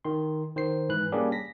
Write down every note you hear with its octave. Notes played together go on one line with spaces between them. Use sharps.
D#3 C6
D#3 C5 C7
G#2 E3 B4 F#6
G3 A#3 C#4 D4 G4 G#4
A#6 B6